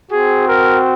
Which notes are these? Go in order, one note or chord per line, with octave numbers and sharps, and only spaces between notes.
C4 F#4 G#4
A#4